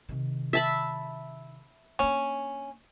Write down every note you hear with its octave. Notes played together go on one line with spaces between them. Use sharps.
C3 D#3
E5 A5 B5
A#3 C#4 D4